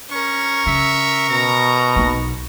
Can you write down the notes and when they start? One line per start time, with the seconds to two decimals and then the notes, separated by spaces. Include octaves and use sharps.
0.10 C#4 A#4 C#6
0.66 C#3 E5
1.30 B2 A#5
1.96 B1 D#4